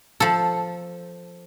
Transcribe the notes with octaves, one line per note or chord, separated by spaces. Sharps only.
F3 A4